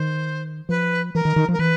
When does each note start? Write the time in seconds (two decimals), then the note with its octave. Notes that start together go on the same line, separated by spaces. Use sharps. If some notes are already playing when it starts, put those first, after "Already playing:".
Already playing: D#3 C5
0.69 F3 B4
1.14 E3 A#4
1.25 D#3
1.36 D#3
1.49 F3 A#4
1.59 E3 B4